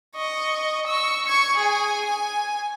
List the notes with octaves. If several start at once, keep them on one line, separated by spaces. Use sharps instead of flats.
D#5 C#6
C#6 E6
C#6 G#6
G#4 G#5
G#5